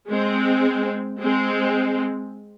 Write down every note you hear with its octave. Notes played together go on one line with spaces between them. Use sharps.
G#3 C4
G#3 C4